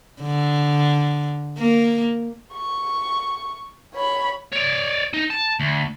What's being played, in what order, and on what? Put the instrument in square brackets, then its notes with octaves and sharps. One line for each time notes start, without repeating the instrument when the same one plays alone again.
[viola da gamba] D3
A#3
[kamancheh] C#6
C#5 B5
[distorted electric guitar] C#5 D5
D#4
A5
D2